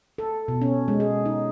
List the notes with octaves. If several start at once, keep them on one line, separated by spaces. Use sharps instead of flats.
A4
B2
C#4
G#3
G#4
D#4